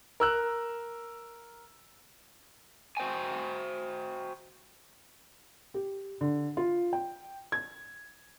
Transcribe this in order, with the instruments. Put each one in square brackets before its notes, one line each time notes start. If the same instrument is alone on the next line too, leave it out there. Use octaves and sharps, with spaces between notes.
[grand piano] A#4 E6 F#6
[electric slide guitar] F#4 C5 G5 G#5
[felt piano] G4
D3
F4
G5
G#6